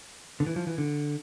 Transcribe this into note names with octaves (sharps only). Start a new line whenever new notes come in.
D3
E3
F3
E3
D3